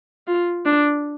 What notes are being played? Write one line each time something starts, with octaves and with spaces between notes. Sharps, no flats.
F4
D4